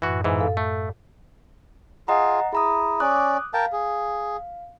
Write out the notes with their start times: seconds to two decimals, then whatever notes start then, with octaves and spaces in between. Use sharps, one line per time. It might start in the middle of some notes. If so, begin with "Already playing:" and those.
0.02 F#2 A2 E3 F#4
0.24 G#2 E3
0.39 A4 F5
0.57 A3
2.08 F4 G#4 D#5 F#5 A#5
2.53 E4 G#4 A#5 D#6
3.00 C#4 D5 D6 D#6 F#6
3.54 A#4 F5 G5 A5
3.72 G#4